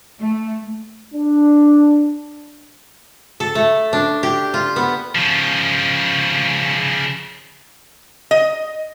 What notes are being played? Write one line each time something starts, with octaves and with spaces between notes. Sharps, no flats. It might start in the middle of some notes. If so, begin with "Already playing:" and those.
A3
D4
A4
A3
D4
G4
F4
B3
C#3 F3
D#5